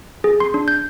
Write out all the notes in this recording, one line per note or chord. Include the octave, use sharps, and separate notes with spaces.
G#4
C6
D4
G6